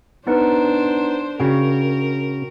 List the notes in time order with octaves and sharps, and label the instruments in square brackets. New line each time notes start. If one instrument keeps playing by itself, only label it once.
[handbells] B3 D#4 B4 [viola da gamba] D4 C5
[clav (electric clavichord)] C#3 [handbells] F#4 G5 [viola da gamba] A#4